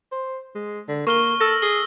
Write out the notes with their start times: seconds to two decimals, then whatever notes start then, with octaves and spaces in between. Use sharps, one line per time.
0.12 C5
0.55 G#3
0.88 D3
1.07 A#3 C#6 F6 G7
1.40 A4 E6 A#6
1.62 G#4 G7